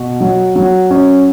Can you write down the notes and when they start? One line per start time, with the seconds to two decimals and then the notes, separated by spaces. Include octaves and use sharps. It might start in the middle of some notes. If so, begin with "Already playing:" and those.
Already playing: B2 F#4
0.21 F#3
0.56 F#3
0.90 C#4